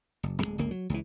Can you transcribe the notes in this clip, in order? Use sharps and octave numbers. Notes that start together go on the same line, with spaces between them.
F#1
D1 E2 G#3
G1 C#2 A#3
F#3
C#2 E3